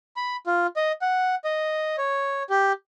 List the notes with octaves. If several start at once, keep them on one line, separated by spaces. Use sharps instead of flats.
B5
F4
D#5
F#5
D#5
C#5
G4